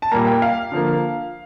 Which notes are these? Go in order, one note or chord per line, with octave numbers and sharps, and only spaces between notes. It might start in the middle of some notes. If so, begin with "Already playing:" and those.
A5
A#2 G3 A#3 A#5
G5
F5
D3 F3 A#3